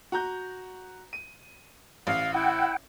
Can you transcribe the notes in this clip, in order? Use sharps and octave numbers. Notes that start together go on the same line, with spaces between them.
F#4 A#5 G6
D#7
A1 F5
E4 F#5 G5